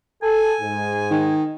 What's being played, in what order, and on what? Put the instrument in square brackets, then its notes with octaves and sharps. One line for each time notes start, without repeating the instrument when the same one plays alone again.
[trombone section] A4 [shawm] G#5
[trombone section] G#2
[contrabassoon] D#3